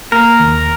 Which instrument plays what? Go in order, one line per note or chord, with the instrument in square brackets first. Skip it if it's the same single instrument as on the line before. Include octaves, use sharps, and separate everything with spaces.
[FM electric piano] A#3 [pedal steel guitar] A#4
[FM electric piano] D#2